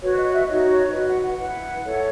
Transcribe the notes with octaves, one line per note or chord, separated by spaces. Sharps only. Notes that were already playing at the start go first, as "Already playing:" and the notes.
F#4 B4 C#5
D#5
E5
D#4 F#4 C#5 D#5
C#5
F#4 B4 D#5
F#5
F#5
E4 B4 F#5
E4 A4 C#5